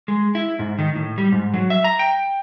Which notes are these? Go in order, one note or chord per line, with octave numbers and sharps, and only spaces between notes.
G#3
E4
G#2
D#3
A2
G3
G#2
F#3
E5
A#5
G5